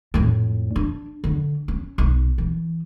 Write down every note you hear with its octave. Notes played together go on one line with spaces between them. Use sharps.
F2 A2
D4
D3
C#4
B1
E3